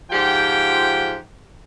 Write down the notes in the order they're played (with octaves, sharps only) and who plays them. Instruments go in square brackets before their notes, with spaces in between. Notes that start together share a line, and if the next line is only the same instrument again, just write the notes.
[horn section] G#2 F3 F4 G4 F#5 G5